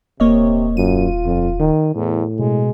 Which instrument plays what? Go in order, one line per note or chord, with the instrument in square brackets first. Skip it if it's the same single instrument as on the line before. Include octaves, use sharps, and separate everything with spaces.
[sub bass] D#1 [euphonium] C3 [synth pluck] A#3 C#5 D#5
[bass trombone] F#2 [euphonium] F4 [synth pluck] D#7
[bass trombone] F2
D#3
[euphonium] E2 [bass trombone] A2
[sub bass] B2 [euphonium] G#3